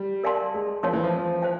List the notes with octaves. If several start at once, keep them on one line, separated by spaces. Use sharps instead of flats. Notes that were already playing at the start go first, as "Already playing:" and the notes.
Already playing: G3
A#4 D5 F5 A5 C6
G#3
F3 A#4 C#5 F5 A5 C6
E3
F3
C5 F5 A5